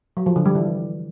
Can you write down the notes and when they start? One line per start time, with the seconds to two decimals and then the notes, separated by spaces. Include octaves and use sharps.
0.17 F#3
0.26 F3
0.36 D3
0.46 G3
0.55 E3